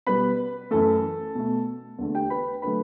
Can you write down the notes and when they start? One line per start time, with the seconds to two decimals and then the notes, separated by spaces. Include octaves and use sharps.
0.07 B2 G3 B3 B4 B5
0.71 F#2 E3 A3 A4 A5
1.35 B2 A3
1.99 E2 D3 A3
2.15 G4 G5
2.30 B4 B5
2.62 D3 F#3 A3 B4 B5